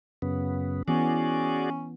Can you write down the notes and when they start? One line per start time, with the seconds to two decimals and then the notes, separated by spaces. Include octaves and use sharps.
0.22 F#2 C#3 B3
0.88 E3 B3 C#4 F#4 G#4 D5